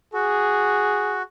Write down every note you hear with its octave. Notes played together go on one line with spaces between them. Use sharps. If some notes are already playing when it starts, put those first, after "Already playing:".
F#4 G#4